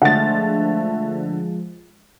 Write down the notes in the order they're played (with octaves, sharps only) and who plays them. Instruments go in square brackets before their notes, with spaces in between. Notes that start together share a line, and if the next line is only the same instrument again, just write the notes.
[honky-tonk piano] D3 A6 [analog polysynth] F3 G#3 [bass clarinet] A3 [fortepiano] F#5